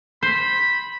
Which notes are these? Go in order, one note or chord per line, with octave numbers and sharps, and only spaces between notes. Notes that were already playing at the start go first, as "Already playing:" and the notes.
C5 B5